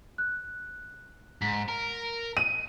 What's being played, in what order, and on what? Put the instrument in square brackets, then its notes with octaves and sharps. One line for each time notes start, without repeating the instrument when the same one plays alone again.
[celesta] F#6
[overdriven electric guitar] G#2 [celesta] B6
[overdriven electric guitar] A#4
[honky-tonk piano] D#7